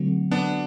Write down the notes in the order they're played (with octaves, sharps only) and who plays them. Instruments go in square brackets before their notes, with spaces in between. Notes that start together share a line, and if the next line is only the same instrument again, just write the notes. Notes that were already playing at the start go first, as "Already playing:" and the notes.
Already playing: [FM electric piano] D3 F#3 A3 C4 F#4
[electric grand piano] B3 D4